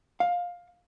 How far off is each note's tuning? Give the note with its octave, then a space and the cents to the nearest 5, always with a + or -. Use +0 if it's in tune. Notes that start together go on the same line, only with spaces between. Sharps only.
F5 +15